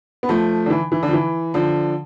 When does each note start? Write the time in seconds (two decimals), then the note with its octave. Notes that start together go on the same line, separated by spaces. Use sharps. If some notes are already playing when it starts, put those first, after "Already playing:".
0.23 B3
0.29 F3 A3
0.66 D3
0.70 E3
0.92 E3
1.03 D3
1.08 F3
1.13 E3
1.54 D3 F3